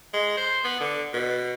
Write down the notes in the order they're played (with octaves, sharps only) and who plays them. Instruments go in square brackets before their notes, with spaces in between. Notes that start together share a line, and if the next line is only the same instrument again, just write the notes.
[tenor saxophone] G#3
C5
B3
D3
B2